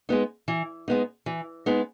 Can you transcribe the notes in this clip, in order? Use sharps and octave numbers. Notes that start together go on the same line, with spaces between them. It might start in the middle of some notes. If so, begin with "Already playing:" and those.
G#3 B3 D#4
E3
G#3 B3 D#4
E3
G#3 B3 D#4